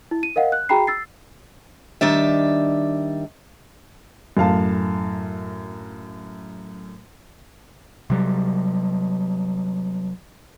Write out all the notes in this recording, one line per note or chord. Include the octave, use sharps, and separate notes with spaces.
E4
D#7
A#4 D#5 F5 F#5
F#6
F#4 G#4 G5 A#5 B5 C7
E6 A6 C7
D#3 G3 D4 E5
F#2 A2 F5 A5
C3 F#3 G3